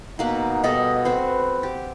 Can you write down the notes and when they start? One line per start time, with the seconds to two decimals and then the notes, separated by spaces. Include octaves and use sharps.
0.19 B2 A#3 D#4 B4
0.64 B2 G3 A4 D#5
1.05 C4 F#4 B4 C5
1.63 G4